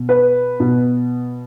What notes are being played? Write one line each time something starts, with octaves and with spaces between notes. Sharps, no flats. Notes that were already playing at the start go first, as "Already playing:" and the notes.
Already playing: B2
B4
B2